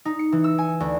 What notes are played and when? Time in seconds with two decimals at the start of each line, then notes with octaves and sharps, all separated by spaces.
0.05 D#4
0.19 C#7
0.32 E3
0.44 E6
0.58 G#5
0.80 D2